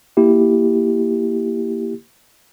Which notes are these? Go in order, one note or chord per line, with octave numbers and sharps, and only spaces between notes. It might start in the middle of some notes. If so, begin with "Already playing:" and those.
A#3 E4 G4